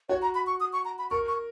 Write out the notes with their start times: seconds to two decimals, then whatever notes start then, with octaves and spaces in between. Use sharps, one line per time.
0.09 F#4 C#5
0.22 A#5
0.35 B5
0.47 C#6
0.60 D#6
0.73 C#6
0.85 A#5
0.99 B5
1.11 A#4 C#6
1.28 C#6